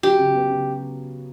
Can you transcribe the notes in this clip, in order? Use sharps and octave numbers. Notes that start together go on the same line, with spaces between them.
F#3 G4
C#3
B3
C#3